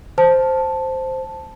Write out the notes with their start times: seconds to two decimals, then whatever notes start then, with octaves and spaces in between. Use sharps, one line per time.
0.18 C5 A5